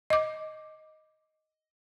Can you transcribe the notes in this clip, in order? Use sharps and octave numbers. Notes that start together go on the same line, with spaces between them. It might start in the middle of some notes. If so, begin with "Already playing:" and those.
D#5 D6